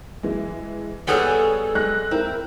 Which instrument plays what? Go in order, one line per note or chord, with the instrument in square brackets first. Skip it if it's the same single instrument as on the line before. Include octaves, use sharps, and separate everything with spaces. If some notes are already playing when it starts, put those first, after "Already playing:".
[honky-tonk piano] E3 G#3
[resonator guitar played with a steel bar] G3 B3 G#4 [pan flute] A4 [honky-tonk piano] C#5 G#5
[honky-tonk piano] G#3 F#6 A#6
[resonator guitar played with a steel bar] C4 [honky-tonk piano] E4 A#4